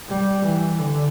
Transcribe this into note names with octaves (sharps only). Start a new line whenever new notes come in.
G3
E3
D3